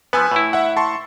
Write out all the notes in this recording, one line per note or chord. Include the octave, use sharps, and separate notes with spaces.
F3 B3 B4 G#5 E6
A2 E4
E5 F#5
A5 C6 C#6